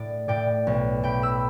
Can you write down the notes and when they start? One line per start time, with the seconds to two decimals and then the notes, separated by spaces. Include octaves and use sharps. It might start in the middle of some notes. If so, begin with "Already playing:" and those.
Already playing: A2 D5
0.28 A2 D5 G5
0.67 B1
1.03 A2 G5 B5
1.22 B5 E6